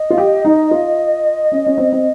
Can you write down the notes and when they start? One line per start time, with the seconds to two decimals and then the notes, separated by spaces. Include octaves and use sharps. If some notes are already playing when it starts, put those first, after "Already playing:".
Already playing: D#5
0.10 F4
0.18 G4
0.45 D#4
0.71 F4
1.52 C#4
1.66 C#4
1.78 C4
1.92 C4